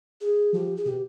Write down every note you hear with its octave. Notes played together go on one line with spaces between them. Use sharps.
G#4
F3 G4
G#4
B2 G4